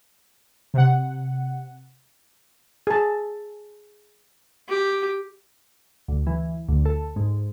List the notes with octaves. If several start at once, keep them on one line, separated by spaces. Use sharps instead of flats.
C3 F#5
G#4 A5
G4
D2
E3
D2
A4
G#2